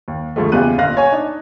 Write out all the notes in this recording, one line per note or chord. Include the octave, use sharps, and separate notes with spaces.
D#2
D2 F3 G#3 A3
F#1 E2 F4 G4 F#6 D#7
G1 A#2 F5 F#6 A#6
C#5 G#5
D4 D#4